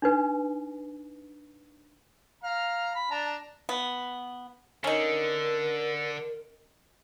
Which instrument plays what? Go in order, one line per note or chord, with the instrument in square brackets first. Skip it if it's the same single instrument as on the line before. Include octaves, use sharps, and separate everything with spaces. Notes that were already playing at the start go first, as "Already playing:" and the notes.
[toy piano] D4 D#4 B4
[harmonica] F5 A#5
B5
D4 A5 A#5
[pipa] B3
[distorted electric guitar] D3 [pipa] C#4 D#4 [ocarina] A#4